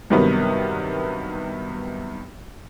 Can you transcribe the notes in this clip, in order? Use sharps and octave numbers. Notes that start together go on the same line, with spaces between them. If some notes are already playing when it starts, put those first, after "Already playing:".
G2 C3 D#3 F#3 B3